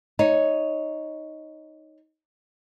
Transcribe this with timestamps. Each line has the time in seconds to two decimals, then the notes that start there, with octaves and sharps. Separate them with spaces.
0.19 D#4 C#5